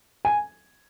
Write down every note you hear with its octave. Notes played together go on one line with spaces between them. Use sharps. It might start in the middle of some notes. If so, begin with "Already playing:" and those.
G#5